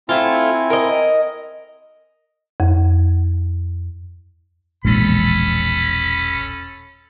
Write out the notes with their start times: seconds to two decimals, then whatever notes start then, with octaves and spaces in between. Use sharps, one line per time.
0.09 A3 C4 E4 F4 G#5
0.70 A#4 D#5
2.60 F2
4.84 E1 A#1 E2 C#4 A4 B5